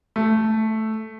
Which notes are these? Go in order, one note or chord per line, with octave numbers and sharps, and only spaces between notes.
A3